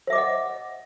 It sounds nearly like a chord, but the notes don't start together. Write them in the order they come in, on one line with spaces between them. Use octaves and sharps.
C5 E5 D6 D#5 F#5